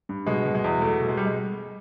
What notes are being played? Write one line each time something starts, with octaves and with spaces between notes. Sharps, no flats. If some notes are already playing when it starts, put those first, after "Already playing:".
G2
B2 G#3
B2
G#3
E2
F#3 A3
B2
G#3
G3
G#3